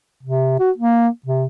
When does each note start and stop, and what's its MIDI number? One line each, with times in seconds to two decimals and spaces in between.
0.23 0.59 48
0.59 0.71 66
0.78 1.08 58
1.26 1.46 48